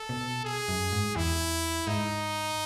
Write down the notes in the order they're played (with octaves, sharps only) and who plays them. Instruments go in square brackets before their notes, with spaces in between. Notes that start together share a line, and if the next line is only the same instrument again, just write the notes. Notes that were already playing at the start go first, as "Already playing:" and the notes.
Already playing: [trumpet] A4
[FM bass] B2
[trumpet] G#4
[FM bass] F#2
G#2
[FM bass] E2 [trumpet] E4
[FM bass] G#2 [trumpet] D#4